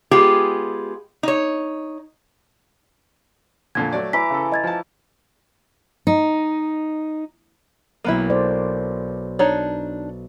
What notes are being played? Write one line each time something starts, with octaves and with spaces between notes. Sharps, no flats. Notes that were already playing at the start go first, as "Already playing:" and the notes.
G#3 B3 F4 G4 G#4
D#4 C#5
F2 A#2 D3 G#6
F#3 A3 D5
E3 A#5 D6 B6
C#3 A4
D#5 G#6 A6
F3 A5
D#4
B1 A#3 B3 E4 D#7
A4 C5 D5
D4 D#4 C#5